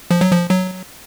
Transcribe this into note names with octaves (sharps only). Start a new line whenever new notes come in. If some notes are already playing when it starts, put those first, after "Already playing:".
F3
F#3
F3
F#3